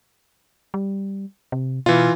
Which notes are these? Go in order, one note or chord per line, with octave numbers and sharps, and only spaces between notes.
G3
C3
B2 E3 F4